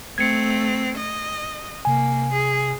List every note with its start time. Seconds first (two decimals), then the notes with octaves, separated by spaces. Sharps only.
0.18 A3 C4 G#6 C#7
0.97 D#5
1.85 C3 A#3 G#5
2.33 G#4